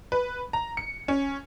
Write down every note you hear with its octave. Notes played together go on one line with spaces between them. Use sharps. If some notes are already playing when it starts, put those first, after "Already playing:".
B4
A#5
C#7
C#4